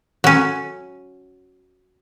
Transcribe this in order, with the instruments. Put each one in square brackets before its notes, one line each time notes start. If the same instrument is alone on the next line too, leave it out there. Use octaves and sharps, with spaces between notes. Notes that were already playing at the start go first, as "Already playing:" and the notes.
[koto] F#3 C#4